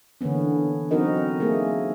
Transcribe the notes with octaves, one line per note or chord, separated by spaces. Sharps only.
D3 E3 A#3 B3 C#4
F#3 C4 D#4 F#4 A#4 D#5
A3 A#3 G#4